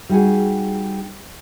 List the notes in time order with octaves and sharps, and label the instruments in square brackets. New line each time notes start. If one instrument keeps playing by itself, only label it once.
[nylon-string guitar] G3 D#4 F#4 G#4